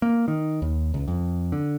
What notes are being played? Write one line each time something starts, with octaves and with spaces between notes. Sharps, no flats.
A#3
D#3
D#2
C#2
F2
D3